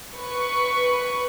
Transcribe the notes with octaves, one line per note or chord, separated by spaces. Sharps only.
B4 C#6